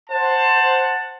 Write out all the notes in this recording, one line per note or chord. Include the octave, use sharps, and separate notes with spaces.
C5 F#5 A5